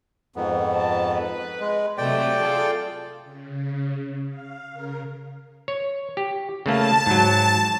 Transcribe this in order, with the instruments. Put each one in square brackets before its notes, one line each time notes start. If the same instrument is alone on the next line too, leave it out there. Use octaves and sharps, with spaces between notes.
[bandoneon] F2 G#2 B3
[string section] A5
B4
[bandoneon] G#3
[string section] C3 F#3 A3 [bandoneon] D5 G5
[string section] F4 G#4 A4
[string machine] C#3
F5
C#3 A#4
[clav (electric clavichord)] C#5
G4
[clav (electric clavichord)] C#3 A3 A#3 [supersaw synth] A5
[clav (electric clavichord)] G#2 F#3